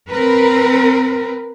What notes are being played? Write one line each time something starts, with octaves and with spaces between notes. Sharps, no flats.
C4 A#4 B4